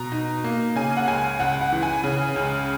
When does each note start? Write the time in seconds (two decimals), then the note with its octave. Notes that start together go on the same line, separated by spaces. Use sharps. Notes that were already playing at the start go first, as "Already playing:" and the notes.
Already playing: B2 A#5
0.12 D#4
0.44 A#3
0.76 C#3 G#5
0.97 F#5
1.08 C#2 G#5
1.40 C#2 F#5
1.61 F#5
1.72 E3
1.83 G#5
2.04 C#3
2.36 C#2